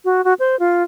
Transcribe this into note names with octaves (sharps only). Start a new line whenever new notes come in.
F#4
F#4
C5
F4